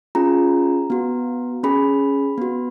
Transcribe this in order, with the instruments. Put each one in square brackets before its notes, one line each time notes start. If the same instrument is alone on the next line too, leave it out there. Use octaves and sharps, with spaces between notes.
[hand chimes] C#4 F4 G#4 A#5
B3 F#4
C#4 G#4 B5
B3 F#4